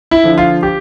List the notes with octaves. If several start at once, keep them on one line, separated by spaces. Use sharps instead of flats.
E4
D3 F3
F4
G4